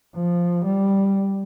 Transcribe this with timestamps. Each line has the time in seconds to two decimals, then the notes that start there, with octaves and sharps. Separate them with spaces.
0.15 F3
0.66 G3